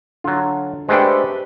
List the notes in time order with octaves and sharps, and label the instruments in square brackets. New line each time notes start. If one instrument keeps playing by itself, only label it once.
[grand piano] D3 [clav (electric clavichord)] F#3 F4
[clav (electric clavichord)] G#3 A3 D4 [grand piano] G4 B4 G5 [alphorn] C5